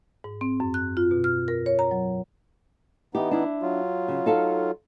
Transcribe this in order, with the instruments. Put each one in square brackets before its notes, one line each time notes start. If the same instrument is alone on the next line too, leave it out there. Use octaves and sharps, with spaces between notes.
[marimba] G#2
C4
F#2
F#6
F4
B2
F6
A#4
C#5
A#5
F#3
[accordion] E3 B3 D#4 [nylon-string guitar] G4
[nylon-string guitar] D4 E4
[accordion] F#3 F4
[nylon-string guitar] C#3
D#4 A4 F5